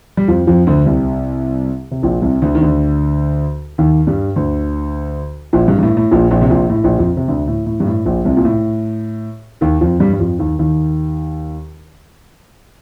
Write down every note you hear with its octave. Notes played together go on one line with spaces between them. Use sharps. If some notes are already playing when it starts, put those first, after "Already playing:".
G3
F2 F3
F2 F3
D2 D3
C2 C3
C3
A#1 A#2
C2 C3
D2 D3
D#3
D2 D3
D#2 D#3
G2 G3
D2 D3
A#1 A#2
G2
G2
A2
A2
A#1 A#2
A#1 A#2
C3
A#1 A#2
A2
A#1 A#2
F2 F3
C3
D2 D3
A2
A2
G2
A2
A#1 A#2
C2 C3
A#2
A2
D#2 D#3
F2 F3
G2 G3
G3
F2 F3
D#2 D#3
D#2 D#3